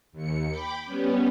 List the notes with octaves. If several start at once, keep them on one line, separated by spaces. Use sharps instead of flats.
D#2 C#7
G5 B5 D6
G3 B3 C#4